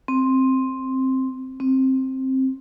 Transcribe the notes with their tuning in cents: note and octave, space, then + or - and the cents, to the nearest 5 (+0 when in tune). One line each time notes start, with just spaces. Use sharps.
C4 +5
C4 +10